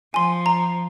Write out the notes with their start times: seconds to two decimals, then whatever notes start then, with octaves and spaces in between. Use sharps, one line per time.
0.14 F3 G#5 C6
0.46 A#5